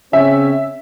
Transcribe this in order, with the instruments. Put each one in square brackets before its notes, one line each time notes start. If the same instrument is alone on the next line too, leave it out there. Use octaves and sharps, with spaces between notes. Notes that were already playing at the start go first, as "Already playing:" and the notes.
[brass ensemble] C#3 C4 C#4 [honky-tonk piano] E5